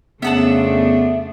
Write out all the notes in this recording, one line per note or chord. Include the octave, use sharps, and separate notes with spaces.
F2 C#3 A3 B3 D4 E5 F#5 A5